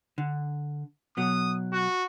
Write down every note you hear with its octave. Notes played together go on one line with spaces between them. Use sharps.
D3
B2 F#3 D#6
F#4